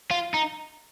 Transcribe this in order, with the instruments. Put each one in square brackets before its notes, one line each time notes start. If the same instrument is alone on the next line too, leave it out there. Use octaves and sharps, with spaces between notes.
[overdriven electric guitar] F4
D#4